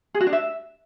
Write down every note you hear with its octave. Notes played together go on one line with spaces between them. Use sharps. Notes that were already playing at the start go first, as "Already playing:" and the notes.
G#4
F#4
D4
E5